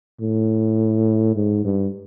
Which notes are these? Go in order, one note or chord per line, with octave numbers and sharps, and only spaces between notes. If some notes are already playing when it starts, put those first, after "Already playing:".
A2
G#2
G2